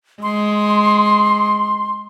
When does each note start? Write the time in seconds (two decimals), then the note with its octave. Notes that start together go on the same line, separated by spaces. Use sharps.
0.23 G#3 C6